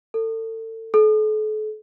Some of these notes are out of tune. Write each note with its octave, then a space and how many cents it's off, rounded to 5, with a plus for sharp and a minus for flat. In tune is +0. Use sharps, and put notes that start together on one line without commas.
A4 +35
A4 -40